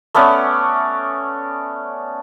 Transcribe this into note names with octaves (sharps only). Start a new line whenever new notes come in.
A3 B3 C#4 D5